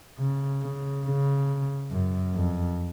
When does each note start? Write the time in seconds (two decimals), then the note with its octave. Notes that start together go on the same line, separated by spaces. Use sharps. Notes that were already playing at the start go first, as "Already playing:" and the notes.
0.19 C#3
0.62 C#3
1.05 C#3
1.91 F#2
2.34 F2